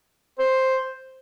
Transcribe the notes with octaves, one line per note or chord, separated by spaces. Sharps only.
C5